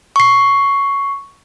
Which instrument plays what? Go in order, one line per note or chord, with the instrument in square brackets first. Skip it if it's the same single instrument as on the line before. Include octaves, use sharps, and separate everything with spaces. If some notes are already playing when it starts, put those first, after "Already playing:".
[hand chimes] C#6 C7